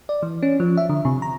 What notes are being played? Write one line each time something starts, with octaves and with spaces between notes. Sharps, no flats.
D5
E3
C#4
F3
E5
D3
C3
A#5